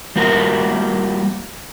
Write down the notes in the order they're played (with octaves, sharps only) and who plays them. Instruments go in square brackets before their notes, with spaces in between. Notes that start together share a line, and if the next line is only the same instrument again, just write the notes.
[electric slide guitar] F3 G3 A#3 F#4 A#4